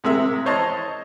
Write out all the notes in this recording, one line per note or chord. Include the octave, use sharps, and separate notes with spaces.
C3 G#3 A#4 E5
C5 C#5 D#5 A5